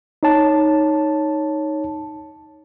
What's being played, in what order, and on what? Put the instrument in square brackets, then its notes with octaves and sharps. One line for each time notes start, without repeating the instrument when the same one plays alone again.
[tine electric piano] D#4 C#5 A5